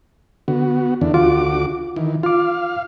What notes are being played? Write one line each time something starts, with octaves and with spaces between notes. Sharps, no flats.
D3 B3 F#4
E2 D3 E3 D4
D2 F4 F#4 D6
D#3 E3
F4 F5 D6